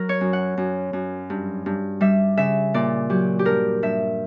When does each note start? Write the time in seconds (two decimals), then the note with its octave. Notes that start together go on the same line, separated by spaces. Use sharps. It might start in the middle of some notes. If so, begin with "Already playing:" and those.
Already playing: F#3 A#4
0.09 C#5
0.21 F#2
0.33 F#5
0.57 F#2
0.93 F#2
1.30 G2
1.66 G2
2.01 G3 E5
2.37 C#3 E5
2.74 A#2 D5
3.10 F#3 G4
3.39 G4
3.45 G2 A#4
3.83 G2 E5